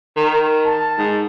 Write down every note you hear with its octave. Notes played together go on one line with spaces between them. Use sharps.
D#3
A5
G#2